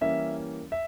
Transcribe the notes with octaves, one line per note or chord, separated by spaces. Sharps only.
E3 G3 A#3 C#4 E5
E5